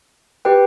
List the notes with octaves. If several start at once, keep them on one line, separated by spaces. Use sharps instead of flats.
G4 B4 G5